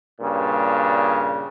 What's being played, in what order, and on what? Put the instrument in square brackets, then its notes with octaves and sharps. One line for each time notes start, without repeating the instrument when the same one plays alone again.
[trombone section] G2 A#2 C#3